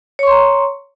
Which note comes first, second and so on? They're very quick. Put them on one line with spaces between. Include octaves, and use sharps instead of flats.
C#5 C#6 C6 A#5